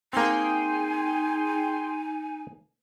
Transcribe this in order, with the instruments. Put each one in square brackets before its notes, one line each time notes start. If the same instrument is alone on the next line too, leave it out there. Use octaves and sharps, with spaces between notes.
[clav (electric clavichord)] A#3 C4 [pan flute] D#4 [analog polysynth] G#4 G5 C6 [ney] G#5